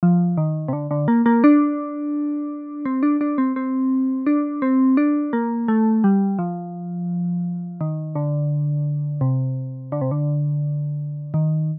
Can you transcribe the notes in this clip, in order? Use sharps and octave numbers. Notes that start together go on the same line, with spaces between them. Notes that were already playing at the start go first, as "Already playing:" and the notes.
F3
D#3
C3
D3
D3
A#3
A#3
D4
C4
D4
D4
C4
C4
D4
C4
D4
A#3
A3
G3
F3
D#3
D3
C3
D3
C3
D3
D#3